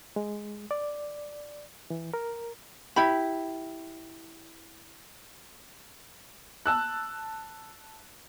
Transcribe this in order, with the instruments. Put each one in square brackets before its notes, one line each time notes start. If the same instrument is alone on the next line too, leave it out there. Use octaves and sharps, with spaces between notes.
[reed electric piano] G#3
D5
E3
A#4
[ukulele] E4 G4 B5
[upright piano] A5 E6 F#6